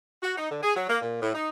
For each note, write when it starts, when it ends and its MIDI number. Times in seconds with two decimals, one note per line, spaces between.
0.23 0.35 66
0.37 0.50 63
0.50 0.58 50
0.62 0.75 68
0.75 0.85 54
0.88 0.98 58
1.01 1.19 46
1.22 1.32 45
1.34 1.49 63